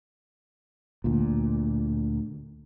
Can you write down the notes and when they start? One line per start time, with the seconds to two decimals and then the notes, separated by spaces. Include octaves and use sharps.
1.04 D2 A#2